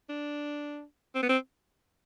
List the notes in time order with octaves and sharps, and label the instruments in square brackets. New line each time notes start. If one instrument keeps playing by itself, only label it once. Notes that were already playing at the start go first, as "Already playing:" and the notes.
[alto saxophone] D4
C4
B3
C4